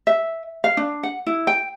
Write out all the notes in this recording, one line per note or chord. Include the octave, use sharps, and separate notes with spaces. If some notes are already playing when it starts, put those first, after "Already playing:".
E5
F5
D4
F#5
E4
G5